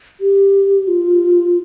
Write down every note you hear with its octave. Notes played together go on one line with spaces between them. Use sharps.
G4
F4